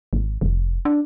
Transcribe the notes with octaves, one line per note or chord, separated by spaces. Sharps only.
G#1
F1
D4